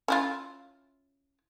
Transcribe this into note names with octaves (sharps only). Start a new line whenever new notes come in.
C#4 E4 F4